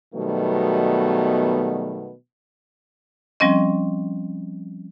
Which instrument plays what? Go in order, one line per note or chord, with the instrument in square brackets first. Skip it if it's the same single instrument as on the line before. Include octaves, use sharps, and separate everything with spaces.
[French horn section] B2 D#3 F#3 G3 A3 B3
[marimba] F3 G3 C4 C#4 D#5